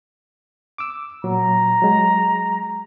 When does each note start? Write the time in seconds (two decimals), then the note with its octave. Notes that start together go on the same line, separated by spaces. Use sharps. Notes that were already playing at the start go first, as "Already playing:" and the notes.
0.78 D6 E6
1.24 A#2 F#3 A#5
1.82 F#3 G#3